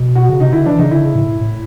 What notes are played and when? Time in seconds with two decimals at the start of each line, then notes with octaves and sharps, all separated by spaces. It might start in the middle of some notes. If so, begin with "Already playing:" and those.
Already playing: B2
0.15 F#4
0.30 C#3
0.40 C3 D#4
0.53 D3 E4
0.66 E3 D4
0.78 C#3 D#4
0.91 D3 E4
1.04 C#3
1.15 A2
1.28 A2
1.41 A2